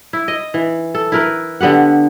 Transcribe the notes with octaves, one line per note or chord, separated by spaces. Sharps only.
E4
D#5
E3
A4
E4 A#4 B4
D3 B3 G4 F#5